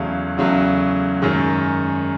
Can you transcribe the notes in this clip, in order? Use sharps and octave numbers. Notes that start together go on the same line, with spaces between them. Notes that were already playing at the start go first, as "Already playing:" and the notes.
Already playing: E2 C#3 F#3 A3 F5
E2 C#3 F#3 A3
F#2 D#3 G#3